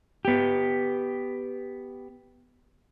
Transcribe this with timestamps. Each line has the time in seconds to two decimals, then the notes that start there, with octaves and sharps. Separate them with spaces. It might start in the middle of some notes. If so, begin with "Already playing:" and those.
0.25 B3 G4